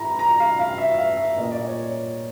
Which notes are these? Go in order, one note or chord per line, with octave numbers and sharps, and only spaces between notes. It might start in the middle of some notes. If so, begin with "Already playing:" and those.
Already playing: A2 E3 A#5 B5
A#5
F5
F5
E5
E5
F5
E5
A#2 D#5
D5
C#5